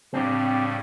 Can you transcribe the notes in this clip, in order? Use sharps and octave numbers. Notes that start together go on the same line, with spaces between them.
A2 C#3 G3 C4 D4 G4